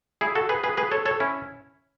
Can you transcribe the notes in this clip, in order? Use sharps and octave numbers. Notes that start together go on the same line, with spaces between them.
E4 G#4
F#4 A4
G#4 B4
G#4 B4
G#4 B4
A4 C#5
A4 C#5
C#4 E4